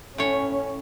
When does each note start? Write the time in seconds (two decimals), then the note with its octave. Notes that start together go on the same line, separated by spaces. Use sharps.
0.18 A2 C#4 C#5